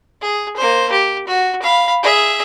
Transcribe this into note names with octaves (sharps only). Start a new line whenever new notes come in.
G#4
A#3 C5
G4
F#4
F5 B5
G#4 E5